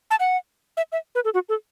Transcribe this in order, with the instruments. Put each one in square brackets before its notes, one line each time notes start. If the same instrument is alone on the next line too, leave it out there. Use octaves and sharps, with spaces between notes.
[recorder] A5
F#5
E5
E5
B4
A4
F#4
A4